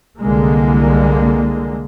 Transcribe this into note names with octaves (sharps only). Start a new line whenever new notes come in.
C2 D3 G#3 A#3